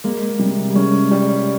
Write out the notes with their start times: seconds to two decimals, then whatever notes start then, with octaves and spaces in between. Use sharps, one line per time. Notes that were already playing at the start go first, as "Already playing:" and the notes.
0.04 G#3 A#3
0.39 C3 G3
0.70 G3
0.75 G#3 C#4
1.11 G3